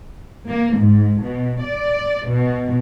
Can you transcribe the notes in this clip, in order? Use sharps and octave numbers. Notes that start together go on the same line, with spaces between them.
A#3
G#2
B2
D5
B2